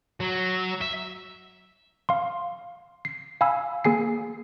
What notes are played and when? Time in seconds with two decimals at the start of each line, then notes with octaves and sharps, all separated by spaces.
0.20 F#3
0.81 E5
2.09 F5 C6
3.05 C7
3.41 F5 G#5 B5 E6
3.84 A#3 G#4 G#5 C7